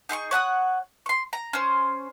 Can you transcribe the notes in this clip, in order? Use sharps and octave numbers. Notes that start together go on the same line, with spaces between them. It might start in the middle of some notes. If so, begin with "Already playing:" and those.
D#4 G#4 C6 C#6
C#5 F#5 A5 D#6
C6 C#6
A#5
C#4 C5